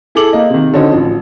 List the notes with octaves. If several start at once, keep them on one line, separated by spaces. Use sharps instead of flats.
E4 G#4 A4 D6 F#7
A#3 D#5
C3 D#3
D3 C4 C#4 D#4 F#4
A1 F3